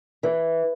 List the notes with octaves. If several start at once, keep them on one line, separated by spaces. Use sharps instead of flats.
E3